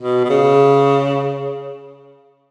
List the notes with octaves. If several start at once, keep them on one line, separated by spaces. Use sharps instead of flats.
B2
B2
C#3